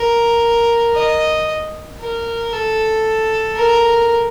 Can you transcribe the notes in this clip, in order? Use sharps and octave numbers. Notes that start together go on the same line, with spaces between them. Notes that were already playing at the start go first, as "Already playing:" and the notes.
Already playing: A#4
D#5
A#4
A4
A#4